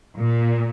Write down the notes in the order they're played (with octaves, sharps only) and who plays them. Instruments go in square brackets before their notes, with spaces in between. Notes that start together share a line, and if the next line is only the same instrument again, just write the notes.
[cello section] A#2